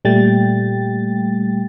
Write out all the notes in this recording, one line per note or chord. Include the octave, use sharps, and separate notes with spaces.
A#2 G3 A3 G5 A6